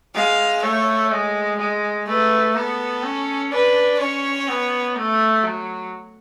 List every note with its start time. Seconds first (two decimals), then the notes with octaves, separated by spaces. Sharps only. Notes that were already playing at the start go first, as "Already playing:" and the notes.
0.15 G#3 F5
0.63 A3 C#5
1.11 G#3
1.59 G#3
2.07 A3 B4
2.55 B3 A4
3.03 C#4
3.52 D4 B4
3.99 C#4 C#5
4.48 B3
4.95 A3
5.43 F#3